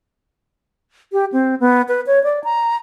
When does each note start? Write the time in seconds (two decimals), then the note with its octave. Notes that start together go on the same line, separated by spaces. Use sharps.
1.12 G4
1.32 C4
1.60 B3
1.89 B4
2.07 C#5
2.23 D5
2.44 A#5